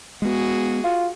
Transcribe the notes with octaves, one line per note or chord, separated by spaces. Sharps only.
G#3 B3 F#4 G#4
F4